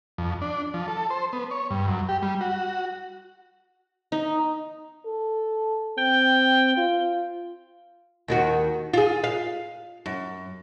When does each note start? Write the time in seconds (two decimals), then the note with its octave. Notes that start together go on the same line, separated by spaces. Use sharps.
0.18 F2
0.42 D4
0.74 F3
0.88 A4
1.10 C5
1.33 B3
1.51 C#5
1.70 G2
1.87 F#2
2.09 G4
2.22 G3
2.41 F#4
4.12 D#4
5.05 A4
5.98 C4 G5
6.77 F4
8.28 D#2 D#3 F#4
8.94 F4 G#4
9.24 F5
10.06 F#2